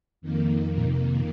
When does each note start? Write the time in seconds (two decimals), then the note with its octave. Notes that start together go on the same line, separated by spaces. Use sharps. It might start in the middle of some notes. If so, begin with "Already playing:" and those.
0.21 F2 D#3 A#3
0.78 A#2
0.85 C3